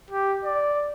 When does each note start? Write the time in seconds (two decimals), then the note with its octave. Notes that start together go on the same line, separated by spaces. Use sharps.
0.11 G4
0.45 D5